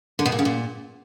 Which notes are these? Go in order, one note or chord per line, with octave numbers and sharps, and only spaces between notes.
D3
B2
A#2
C#3
A#2